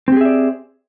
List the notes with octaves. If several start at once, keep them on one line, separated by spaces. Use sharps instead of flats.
C4 G4 G#4 D5 E5